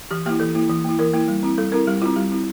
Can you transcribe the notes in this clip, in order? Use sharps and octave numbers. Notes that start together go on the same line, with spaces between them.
E3 G4
A#3 E4 G4
E3 A4
A#3 E4
E3
A#3 E4
E3 A#4
A#3 E4
G3
C4 E4
G3 A4
C4 E4 A#4
G3 G4
C4 E4 F4
G3 G4
C4 E4